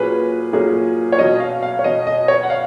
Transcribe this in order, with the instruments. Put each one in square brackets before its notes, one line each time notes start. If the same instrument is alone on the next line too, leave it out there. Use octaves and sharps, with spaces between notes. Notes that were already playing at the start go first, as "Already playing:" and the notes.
Already playing: [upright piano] A#2 F#3 C#4 G#4 [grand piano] B4
[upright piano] A#2 F#3 C#4 G#4
[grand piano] C#5
[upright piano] B2 F#3 C#4 [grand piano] D#5
[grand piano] F5
F5
C#5
[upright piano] B2 F#3 C#4 [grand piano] D#5
[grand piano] D#5
C#5
F#5
F5